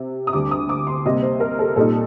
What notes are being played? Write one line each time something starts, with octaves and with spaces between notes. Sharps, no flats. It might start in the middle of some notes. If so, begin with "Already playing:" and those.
Already playing: C3
D#6
D2 D3 G3 D6
D#6
D6
C6
C3 G3 A#3 D#5
C5
A#4
A4
A#2 G3 A#3 D#4 A4